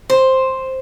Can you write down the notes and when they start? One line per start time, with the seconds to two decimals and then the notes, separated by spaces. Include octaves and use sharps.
0.10 C5